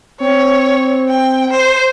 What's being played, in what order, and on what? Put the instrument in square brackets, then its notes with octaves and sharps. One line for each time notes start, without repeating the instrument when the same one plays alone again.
[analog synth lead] C4 [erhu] C#5
[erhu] G5
C5